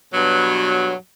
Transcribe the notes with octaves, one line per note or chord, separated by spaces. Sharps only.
G2 B2 F#3